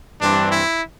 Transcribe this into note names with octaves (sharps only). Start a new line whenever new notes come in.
G2 E3 G3 C4 D4
E4